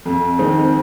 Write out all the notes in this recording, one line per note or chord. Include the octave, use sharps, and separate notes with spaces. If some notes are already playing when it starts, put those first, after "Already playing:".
F2
D#3 G#3 C4 D#4